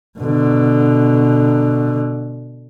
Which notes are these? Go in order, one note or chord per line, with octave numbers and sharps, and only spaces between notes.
B2 D3